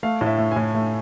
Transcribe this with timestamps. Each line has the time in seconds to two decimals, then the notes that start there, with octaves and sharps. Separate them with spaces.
0.03 A3 F5
0.21 A2
0.27 E5
0.38 A3
0.51 A2 G#5
0.75 A3